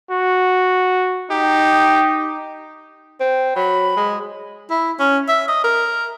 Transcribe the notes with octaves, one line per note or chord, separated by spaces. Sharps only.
F#4
D#4 G4
C4
F#3 B5
G#3
E4
C#4
E5
D#5
A#4